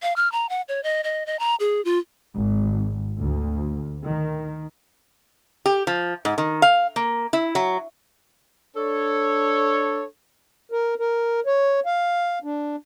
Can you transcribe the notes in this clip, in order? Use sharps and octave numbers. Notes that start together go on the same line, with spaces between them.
F5
F6
A#5
F#5
C#5
D#5
D#5
D#5
A#5
G#4
F4
G#1
D2
D#3
G4
F3
G#2
D#3
F5
A#3
E4
F#3
D4 A4 C#5
A#4
A#4
C#5
F5
D4